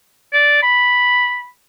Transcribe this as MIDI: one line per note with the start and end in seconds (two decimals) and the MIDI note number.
0.33 0.61 74
0.63 1.48 83